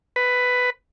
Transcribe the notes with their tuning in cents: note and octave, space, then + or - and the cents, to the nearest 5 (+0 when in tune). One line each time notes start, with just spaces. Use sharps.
B4 +10